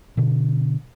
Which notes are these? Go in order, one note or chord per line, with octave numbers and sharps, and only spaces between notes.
B2 D3